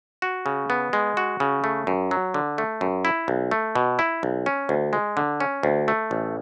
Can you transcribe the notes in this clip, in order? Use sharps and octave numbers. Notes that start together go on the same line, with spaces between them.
F#4
C#3
B3
G#3
F#4
C#3
A3
F#2
F#3
D3
A3
F#2
E4
B1
A3
B2
E4
B1
C#4
D2
G#3
D3
C#4
D2
A3
A1